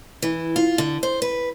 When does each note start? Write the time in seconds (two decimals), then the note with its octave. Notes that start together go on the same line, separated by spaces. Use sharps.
0.22 E3
0.56 F4
0.78 D3
1.03 C5
1.22 B4